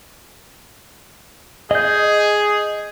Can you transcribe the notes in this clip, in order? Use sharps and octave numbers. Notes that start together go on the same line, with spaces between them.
G#4 D#5 G6